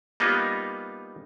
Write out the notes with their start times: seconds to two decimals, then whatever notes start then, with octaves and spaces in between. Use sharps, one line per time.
0.20 G3 A#3 B3 D#4 F4